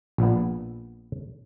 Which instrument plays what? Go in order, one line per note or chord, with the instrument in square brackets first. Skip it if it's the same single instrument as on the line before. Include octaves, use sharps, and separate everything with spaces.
[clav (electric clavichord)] A#1 A#2 B3